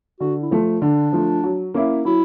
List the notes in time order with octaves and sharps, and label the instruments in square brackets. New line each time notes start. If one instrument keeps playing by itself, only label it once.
[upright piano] D3 [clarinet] F#4
[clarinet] E4
[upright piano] F3 A3
[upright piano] D3 [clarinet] D4
[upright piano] F3 A3
F#3
A#3 C#4 E4
[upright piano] F#3 [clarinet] E4